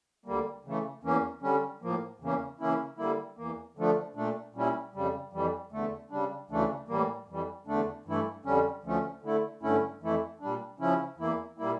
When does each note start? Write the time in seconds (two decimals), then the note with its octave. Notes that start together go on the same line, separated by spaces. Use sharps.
0.26 D2 D3 G3 A#3
0.65 C#3 E3 A3
1.03 E2 E3 A#3 C#4
1.42 D3 G3 C#4
1.82 A2 F3 A#3
2.20 E2 C#3 E3 A#3 C#4
2.60 C#3 E3 A#3 C#4 E4
2.98 D3 G3 A#3 E4
3.37 E2 E3 A#3
3.77 D3 F3 A3 D4
4.15 A#2 A3 D4
4.55 A#2 G3 C#4 E4
4.94 F2 C#3 G3
5.33 F2 E3 G3
5.72 E2 D3 A3
6.10 C#3 G3 D4
6.50 D2 C#3 E3 A3 D4
6.88 A2 E3 G3 A#3
7.28 F2 E3 G3
7.67 E2 D3 A3 D4
8.05 G2 E3 A3 E4
8.45 F2 D3 G3 C#4
8.84 D2 D3 F3 A3 C#4
9.22 D3 A3 E4
9.62 G2 D3 A3 C#4 E4
10.02 F2 E3 A3 E4
10.40 A#2 G3 D4
10.79 C#3 F3 C#4 E4
11.18 E2 E3 A#3 E4
11.58 A#2 G3 A#3 E4